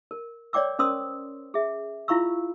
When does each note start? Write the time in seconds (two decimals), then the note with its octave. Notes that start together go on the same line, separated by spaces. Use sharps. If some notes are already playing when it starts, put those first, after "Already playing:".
0.11 A#4
0.53 C#5 D5 G5 D6 E6
0.79 C#4 A#4 C5 C6 D#6 E6
1.54 G#4 E5
2.08 E4 F4 F5 B5 C#6 E6